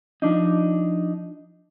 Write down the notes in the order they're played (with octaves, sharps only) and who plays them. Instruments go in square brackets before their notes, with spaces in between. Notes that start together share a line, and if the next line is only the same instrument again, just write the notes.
[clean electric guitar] F3 D4 D#4